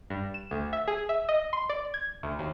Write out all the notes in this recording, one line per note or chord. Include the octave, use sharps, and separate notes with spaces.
G2
E7
D2
E5
G#4
E5
D#5
C6
D5
G#6
D2
D#2